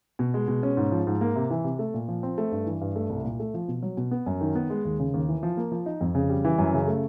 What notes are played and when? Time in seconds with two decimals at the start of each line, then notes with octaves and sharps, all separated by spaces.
0.19 B2
0.34 G#3
0.48 B2
0.63 C#4
0.77 G#2
0.92 F3
1.07 G#2
1.21 A#3
1.36 C3
1.50 E3
1.64 C3
1.79 A3
1.94 A#2
2.08 F3
2.23 C4
2.38 A3
2.52 G2
2.66 E3
2.81 G2
2.96 A3
3.10 C2
3.25 A#2
3.40 A3
3.54 F3
3.68 B2
3.83 F#3
3.97 B2
4.11 B3
4.26 F#2
4.41 D#3
4.55 B3
4.70 G#3
4.85 D#2
5.00 C#3
5.14 D#2
5.28 E3
5.43 F3
5.57 A#3
5.72 F3
5.86 D#4
6.01 F2
6.15 C#3
6.30 G3
6.45 E3
6.58 F#2
6.74 C#3
6.87 A3